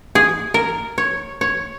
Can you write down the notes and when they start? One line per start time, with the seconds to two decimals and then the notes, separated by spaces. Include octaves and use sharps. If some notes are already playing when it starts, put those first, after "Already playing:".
0.15 G#4
0.54 A#4
0.98 C#5
1.41 C#5